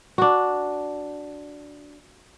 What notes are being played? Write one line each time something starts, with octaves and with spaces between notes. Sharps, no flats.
D4 F#4